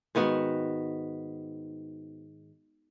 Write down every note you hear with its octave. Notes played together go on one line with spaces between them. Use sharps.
G#2 D#3 B3 F#4